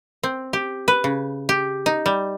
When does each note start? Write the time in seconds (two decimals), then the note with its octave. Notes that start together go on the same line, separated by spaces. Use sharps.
0.23 C4
0.53 G4
0.88 B4
1.04 C#3
1.49 G4
1.86 D#4
2.06 G3